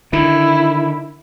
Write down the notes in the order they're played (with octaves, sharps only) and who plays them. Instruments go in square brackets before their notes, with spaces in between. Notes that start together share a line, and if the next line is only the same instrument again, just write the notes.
[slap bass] D3 D#3 [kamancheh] E4